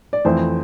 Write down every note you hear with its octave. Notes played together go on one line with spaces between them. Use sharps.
D5
F2 E3 A3 E4 C5